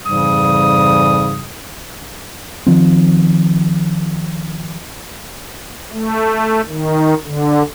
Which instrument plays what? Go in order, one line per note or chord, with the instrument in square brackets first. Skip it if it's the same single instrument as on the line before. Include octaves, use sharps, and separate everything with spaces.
[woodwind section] F2 G#2 C#3 E3 G3 D#6
[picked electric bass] D#3 F3 C4
[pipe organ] A3
D#3
D3